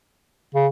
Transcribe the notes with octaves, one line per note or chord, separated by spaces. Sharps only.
C#3